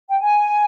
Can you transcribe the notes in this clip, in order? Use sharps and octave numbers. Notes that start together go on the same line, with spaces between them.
G5
G#5